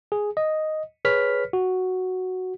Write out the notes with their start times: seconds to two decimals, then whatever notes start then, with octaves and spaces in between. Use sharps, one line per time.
0.12 G#4
0.37 D#5
1.05 G#4 B4 C#5 F6 B6
1.53 F#4